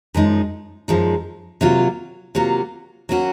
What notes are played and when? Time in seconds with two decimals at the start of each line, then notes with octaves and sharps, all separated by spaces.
0.14 F#2 F3 G#3 D#4
0.88 F#2 F3 G#3 D#4
1.61 C3 F#3 A#3 F4
2.35 C3 F#3 A#3 F4
3.09 F#3 A#3 C#4 F#4